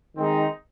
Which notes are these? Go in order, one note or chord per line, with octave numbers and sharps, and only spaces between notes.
D#3 G#3 C4 D#4